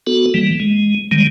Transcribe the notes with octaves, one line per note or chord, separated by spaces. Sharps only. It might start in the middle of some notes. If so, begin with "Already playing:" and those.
B3 F#4 A4
E3 G3 A#3
G#3
D#3 G3 G#3